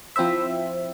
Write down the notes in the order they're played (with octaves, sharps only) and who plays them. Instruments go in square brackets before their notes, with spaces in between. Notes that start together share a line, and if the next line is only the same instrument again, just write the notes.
[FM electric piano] F3 C4 E4 C5 E5